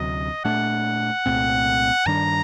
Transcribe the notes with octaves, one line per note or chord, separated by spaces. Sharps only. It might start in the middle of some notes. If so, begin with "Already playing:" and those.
Already playing: D2 C3 F#3 D#5
A#2 A3 D4 F#5
C2 A#2 A3 C4
G2 D#3 G3 D4 A#5